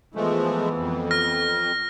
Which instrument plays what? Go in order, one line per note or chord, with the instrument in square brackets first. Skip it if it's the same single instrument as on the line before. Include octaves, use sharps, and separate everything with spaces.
[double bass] E3 B3 [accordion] F3 G#3 A3
[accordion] F2
[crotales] F6 A#6